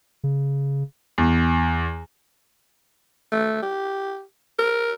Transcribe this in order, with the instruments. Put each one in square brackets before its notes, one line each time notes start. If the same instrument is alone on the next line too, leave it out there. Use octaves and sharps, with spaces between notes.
[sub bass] C#3
[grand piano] E2
[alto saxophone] A3
G4
A#4